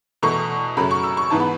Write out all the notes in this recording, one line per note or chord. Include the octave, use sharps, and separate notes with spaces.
E2 B2 A3 C#6
F#2 C#3 F#3 A3 B5
C#6
E6
C#6
G#2 E3 B3 A5
B5